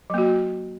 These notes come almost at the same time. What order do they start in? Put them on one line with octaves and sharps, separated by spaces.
F#3 A#3 F#4